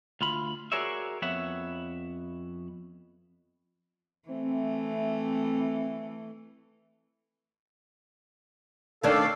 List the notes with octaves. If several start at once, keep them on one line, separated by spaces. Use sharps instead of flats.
D2 F4 B5
F#4 G#4 A#4 C#5 D5 E5
F2 B3 C#5 E5 F#5
E3 A3 C4
D#3 C#4 D4 A4 F5